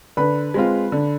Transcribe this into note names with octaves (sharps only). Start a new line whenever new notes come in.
D3 B4 B5
G#3 C4 F4
D3